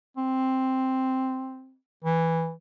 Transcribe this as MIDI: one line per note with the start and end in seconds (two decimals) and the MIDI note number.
0.17 1.76 60
2.04 2.52 52